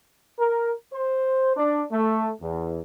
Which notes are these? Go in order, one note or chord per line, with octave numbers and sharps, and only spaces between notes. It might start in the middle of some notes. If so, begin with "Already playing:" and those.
A#4
C5
D4
A3
E2